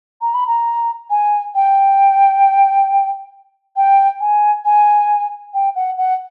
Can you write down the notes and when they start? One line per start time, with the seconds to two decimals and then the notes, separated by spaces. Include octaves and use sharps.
0.21 A#5
0.34 B5
0.47 A#5
1.10 G#5
1.55 G5
3.77 G5
4.21 G#5
4.65 G#5
5.54 G5
5.76 F#5
5.98 F#5